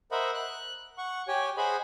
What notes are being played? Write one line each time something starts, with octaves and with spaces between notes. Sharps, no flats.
A#4 C5 D#5 E5 F#5 B5
F#6
F#5 C#6
G4 C#5 G5 G#5
G#4 C5 D#5 F#5 G#5 B5